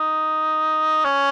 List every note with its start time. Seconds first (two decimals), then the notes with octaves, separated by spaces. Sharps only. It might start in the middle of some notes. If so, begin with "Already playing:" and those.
Already playing: D#4
1.05 C#4